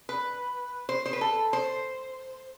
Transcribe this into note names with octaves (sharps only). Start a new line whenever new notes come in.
B4
C5
C5
B4
A4
C5